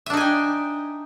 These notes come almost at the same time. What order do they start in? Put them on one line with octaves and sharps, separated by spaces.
E5 D4 D#4 G#5 G5